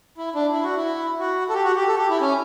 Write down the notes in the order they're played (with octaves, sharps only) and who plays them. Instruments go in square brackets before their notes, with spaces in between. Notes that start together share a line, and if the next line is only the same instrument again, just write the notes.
[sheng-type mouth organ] E4
D4
E4
F#4
E4
F#4
A4
G4
F#4
G4
A4
G4
E4
C#4